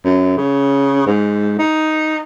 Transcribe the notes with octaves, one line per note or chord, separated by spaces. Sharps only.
F#2
C#3
G#2
D#4